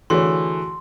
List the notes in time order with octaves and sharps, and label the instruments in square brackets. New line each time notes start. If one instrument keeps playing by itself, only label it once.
[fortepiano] D3 E3 A3 [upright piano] F#4 G#4 C#5 [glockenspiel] C6